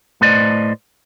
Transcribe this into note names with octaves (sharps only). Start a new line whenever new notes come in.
A2 A3 B4 C5 D5 D#5